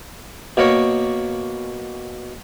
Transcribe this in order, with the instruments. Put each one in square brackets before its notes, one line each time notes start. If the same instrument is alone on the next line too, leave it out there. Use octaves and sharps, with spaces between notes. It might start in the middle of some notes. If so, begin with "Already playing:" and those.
[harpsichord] B2 A#3 A#4 C#5